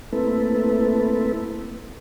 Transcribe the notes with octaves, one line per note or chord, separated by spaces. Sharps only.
A3 A#3 C4 E4 A4 B4